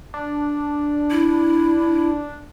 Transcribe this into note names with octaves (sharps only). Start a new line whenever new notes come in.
D4
E4